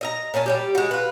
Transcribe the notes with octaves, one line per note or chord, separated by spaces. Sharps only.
D#5 E5 A#5
A#2 C#4 G#5 A5
G3 G#3 G4
G#3 F#4
F4 B4